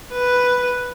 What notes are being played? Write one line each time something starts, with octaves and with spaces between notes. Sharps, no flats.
B4